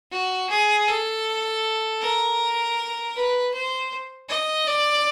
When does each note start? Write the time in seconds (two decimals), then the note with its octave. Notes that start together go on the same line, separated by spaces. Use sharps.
0.11 F#4
0.49 G#4
0.88 A4
2.01 A#4
3.16 B4
3.54 C5
4.29 D#5
4.67 D5